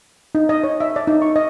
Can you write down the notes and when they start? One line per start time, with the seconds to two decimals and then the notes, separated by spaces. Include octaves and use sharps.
0.35 D#4
0.49 D#5
0.64 C#5
0.81 E5
0.96 D5
1.07 D#4
1.22 C#6
1.36 D#5